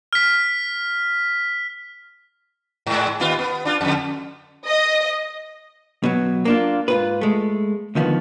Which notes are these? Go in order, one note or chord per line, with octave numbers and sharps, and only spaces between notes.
F6 B6
G#2 G#3
D#2 B3 F4
B3
D4 F4
F2 D3
D#5
B2 F#3
A#3 D4 F4
G#2 F4 B4
G#3 A3
D2 D#3 F3 B3